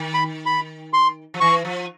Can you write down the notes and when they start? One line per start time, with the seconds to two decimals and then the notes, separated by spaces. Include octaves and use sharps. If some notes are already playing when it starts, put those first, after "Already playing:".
Already playing: D#3
0.14 B5
0.46 B5
0.93 C6
1.34 F3
1.40 E3 C#6
1.65 F3